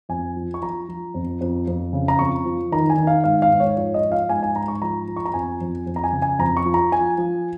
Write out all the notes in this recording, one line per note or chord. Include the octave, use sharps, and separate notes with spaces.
F2 G#5
F3
C#6
F3 A#5
F3
F2
F2
F2
C#3
A#5
F2 C#6
F3
D#3 A#5
G#5
D#3
F5
G#2 F5
F5
G#2
C#5
F3 C#5
D#5
F3
F5
G#2 G#5
G#5
G#2 A#5
C#6
F3 A#5
F3
C#6
A#5
F2 G#5
F2
F2
A#5
G#5
C#3
G#5
F2 A#5
C#6
F3
A#5
F3 G#5
F3